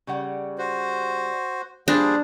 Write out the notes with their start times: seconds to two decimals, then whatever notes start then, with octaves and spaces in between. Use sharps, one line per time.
0.07 C#3 G3 F#5
0.58 F#4 C5
1.88 F3 G3 A#3 D4 G#4 C5